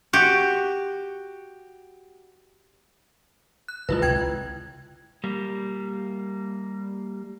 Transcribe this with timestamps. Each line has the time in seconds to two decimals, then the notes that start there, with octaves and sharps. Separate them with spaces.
0.13 F#4 G4
3.68 F#6
3.89 F#1 G#3 E4 F4 B4
4.02 C#2 C3 G5 G#6
5.24 G3 A#3